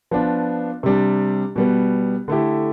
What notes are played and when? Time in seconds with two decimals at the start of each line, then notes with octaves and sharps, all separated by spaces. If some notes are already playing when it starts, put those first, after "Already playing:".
0.11 F3 B3 D4 F4
0.83 C3 G3 D4
1.56 B2 G3 B3
2.28 D3 A3 E4 G4